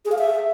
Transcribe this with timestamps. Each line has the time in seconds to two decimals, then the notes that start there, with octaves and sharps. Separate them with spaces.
0.05 G#4
0.12 F5
0.18 E5